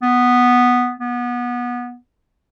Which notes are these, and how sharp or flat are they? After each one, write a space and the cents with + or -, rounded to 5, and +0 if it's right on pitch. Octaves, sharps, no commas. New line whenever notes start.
B3 +0
B3 -20